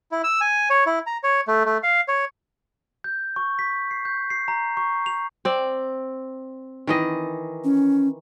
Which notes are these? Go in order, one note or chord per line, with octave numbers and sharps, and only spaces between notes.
E4
E6
G#5
C#5
E4
A#5
C#5
A3
A3
F5
C#5
G6
C#6
B6
C7
G6
C7
A#5
C#6
F7
C4 D5
D#3 E3 D#5
C#4